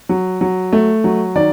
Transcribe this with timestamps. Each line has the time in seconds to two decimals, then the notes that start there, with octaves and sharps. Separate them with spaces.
0.09 F#3
0.41 F#3
0.73 A3
1.04 F#3
1.36 D#3 D5